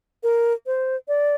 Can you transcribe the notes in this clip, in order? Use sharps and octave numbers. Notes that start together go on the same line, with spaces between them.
A#4
C5
D5